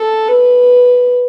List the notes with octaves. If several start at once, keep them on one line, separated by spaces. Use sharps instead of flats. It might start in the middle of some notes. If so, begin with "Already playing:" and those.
Already playing: A4
B4